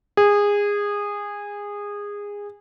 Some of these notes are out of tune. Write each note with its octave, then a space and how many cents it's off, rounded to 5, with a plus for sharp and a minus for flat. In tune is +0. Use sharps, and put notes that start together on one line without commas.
G#4 -20